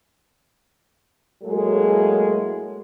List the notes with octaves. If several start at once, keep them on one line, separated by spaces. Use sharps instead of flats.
A2 F#3 G#3 A#3 G#4 A4